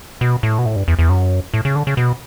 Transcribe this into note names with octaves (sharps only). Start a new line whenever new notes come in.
B2
A2
B2
A2
G2
E2
E2
F#2
A2
C#3
D3
C#3
B2